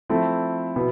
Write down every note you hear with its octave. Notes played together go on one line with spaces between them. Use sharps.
F3 A3 C4 E4 A4
B2 B3 E4